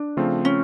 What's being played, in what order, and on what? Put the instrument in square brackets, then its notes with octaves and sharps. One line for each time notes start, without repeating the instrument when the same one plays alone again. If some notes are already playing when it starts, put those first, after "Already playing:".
Already playing: [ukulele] D4
[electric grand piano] C#3 F3 A3 C4 F4
[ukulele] C#4